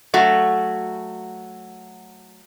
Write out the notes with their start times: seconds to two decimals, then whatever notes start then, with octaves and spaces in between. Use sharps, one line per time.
0.14 F#3 A3 F#4